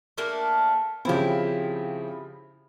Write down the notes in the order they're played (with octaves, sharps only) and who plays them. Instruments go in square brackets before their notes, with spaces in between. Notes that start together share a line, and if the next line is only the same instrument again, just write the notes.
[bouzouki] A3 A#3 D4
[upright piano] C#3 F3 C4 [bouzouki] E4 G4